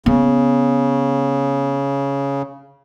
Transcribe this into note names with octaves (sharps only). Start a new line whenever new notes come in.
C#3 B3